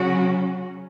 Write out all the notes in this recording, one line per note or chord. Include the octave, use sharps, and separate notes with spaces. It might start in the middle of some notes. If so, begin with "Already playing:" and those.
Already playing: C#3 F#3 C#4 F#4